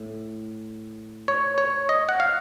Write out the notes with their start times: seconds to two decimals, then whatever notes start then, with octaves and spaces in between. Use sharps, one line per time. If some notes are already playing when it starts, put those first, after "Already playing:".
Already playing: A2
1.28 C#5
1.58 C#5
1.89 D#5
2.09 F#5
2.20 F5